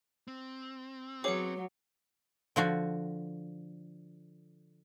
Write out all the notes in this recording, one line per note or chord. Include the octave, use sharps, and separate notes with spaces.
C4
F#3 B3 G#4 C#5 F#5 D6
D3 F3 F#4